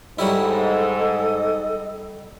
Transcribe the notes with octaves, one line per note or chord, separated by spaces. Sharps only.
G#2 F#3 G3 E4 A4 D#5